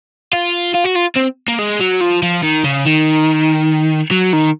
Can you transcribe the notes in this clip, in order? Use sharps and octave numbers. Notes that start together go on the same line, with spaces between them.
F4
F4
F#4
F4
C4
A#3
G#3
F#3
F3
F3
D#3
C#3
D#3
F#3
D#3